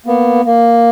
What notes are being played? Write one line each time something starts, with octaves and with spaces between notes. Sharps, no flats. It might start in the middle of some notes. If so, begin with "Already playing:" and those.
A#3 B3
A#3